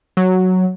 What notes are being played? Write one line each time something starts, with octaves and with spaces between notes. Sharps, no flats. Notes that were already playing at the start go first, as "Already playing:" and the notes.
F#3